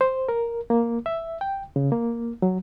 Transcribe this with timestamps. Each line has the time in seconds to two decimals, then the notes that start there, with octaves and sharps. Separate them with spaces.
0.01 C5
0.29 A#4
0.70 A#3
1.06 E5
1.41 G5
1.76 C#3
1.92 A#3
2.42 F#3